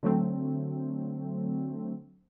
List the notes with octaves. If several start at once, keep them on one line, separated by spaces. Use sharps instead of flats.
D3 F#3 A3 C4